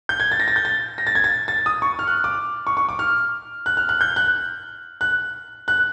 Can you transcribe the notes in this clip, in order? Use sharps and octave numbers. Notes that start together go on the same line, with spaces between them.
G6
G#6
A6
A#6
A6
G6
A6
A#6
A6
G#6
A6
A6
D#6
C#6
F6
F#6
D6
C#6
C#6
D6
F6
F#6
F6
F#6
G6
F#6
F#6
F#6